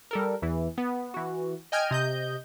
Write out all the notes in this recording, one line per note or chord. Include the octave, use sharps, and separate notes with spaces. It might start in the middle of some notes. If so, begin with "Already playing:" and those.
G3 A4 A#4
E2 E3
B3
E3 F#4
D#5 G5 G#5 F6 G6 G#6
C3 D#5 G6